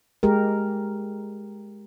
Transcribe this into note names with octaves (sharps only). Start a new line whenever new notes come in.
G#3 G4 A#4